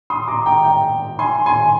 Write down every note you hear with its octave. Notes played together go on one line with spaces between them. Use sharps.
C6 D#6
A#5 D6
G5 A#5
G5
G#5 C6
G#5 C6